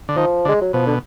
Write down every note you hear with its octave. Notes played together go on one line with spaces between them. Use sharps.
D3
D#3 F3
D3 G#3
F#3
B2 F3
D3